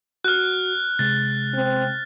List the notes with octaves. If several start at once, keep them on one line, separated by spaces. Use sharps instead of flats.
F#4 F6 F#6
C3 G#3 A6
C4